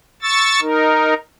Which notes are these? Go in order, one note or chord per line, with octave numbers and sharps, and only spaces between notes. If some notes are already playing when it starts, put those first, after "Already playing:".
C#6 E6 A6
D#4 A#4